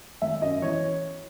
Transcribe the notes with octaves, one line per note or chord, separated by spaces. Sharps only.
G#1 E5
F#2 D#5
E3 C#5